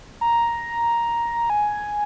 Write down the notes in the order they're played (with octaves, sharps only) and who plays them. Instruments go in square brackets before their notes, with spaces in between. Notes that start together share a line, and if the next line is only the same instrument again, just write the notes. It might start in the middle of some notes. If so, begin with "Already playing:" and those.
[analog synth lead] A#5
G#5